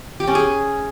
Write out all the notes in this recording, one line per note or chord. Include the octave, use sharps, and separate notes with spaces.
G4
C#4
G#4